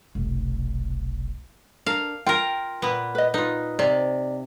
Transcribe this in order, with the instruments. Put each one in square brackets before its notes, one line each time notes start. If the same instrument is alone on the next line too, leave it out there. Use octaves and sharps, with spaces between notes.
[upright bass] F1 B1
[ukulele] D4 A#4 [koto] F5
[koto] F4 A#4 [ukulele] G5
[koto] A#2 B3
[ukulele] B4 D#5
[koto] D#4 [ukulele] F4 B4
[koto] C3 [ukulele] D5